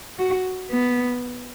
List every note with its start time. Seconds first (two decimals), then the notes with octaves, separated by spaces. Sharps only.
0.19 F#4
0.71 B3